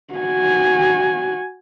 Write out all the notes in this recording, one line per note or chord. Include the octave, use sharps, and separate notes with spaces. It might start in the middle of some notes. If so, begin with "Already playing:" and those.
F#4 G#5